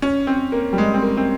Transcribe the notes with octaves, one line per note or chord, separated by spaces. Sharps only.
C#4
C4
A#3
G3
G#3
C4
A#3
C4